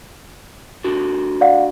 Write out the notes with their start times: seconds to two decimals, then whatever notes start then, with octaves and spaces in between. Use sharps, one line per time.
0.84 D4 F#4 G4
1.41 D5 F5 F#5